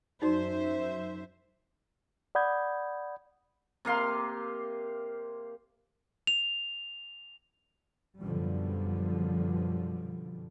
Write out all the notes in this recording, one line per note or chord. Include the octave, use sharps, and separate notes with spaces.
F#2 D#4 F#4 C5 D5 E5
D5 F#5 B5 D#6 G6 G#6
C3 A#3 F5 C6
F7
F#2 B2 D3 F3 G3